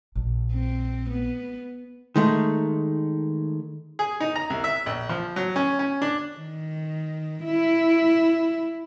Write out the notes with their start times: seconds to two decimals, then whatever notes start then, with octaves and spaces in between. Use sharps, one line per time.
0.15 A#1
0.54 C4
1.10 B3
2.16 D#3 G#3 A3
3.99 G#4
4.20 D#4
4.36 A#5
4.50 C2
4.64 E5
4.86 A#1
5.09 F3
5.36 F#3
5.56 C#4
5.79 C#4
6.02 D4
6.37 D#3
7.44 E4